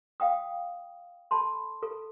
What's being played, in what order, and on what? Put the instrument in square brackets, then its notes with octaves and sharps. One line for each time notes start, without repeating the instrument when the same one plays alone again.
[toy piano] F5 G5 D#6
A4 A5 B5 C6
A4